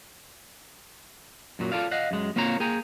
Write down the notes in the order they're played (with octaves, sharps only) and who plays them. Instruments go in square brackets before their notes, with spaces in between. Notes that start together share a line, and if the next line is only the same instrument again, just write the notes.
[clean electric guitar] F#2 A#2 F#3
F4 A4 D5 F5
D#5 F5 F#5
F#2 G#3
A#3 C4 F4 C#5 A#5
A#3 G#4 G5 G#5 A#5